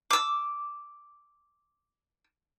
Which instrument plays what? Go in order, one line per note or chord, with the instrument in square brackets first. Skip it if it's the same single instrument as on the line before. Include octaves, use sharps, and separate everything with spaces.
[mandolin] D6 E6